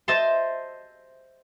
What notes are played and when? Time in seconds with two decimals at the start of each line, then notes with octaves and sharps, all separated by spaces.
0.08 C5 D#5 E5 A5 C6